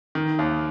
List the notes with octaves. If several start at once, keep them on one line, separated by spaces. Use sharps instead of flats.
D#3
D#2